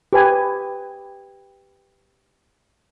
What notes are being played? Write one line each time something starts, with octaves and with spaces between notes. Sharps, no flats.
G4 B4 G#5